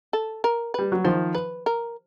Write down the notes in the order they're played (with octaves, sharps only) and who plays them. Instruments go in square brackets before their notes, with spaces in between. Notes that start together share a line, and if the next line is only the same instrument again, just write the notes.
[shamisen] A4
A#4
[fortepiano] G3 [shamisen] B4
[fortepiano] F#3
[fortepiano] D#3 F3 [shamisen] C5
[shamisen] B4
A#4